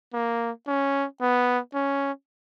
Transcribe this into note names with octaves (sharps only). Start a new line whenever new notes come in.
A#3
C#4
B3
C#4